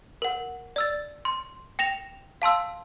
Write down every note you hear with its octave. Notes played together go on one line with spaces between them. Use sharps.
A#4 F#5
D5 E6 A6
C6
G5 A#6 E7 F7
F5 A5 C6 E6